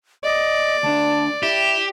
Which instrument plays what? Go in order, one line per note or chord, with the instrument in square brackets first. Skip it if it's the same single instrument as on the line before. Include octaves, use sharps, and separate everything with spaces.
[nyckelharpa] D5 [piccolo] D#5
[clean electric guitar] D2 D4 [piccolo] A5
[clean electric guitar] E4 [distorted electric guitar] G4 [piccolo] E7